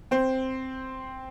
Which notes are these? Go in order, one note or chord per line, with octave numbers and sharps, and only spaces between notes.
C4 C5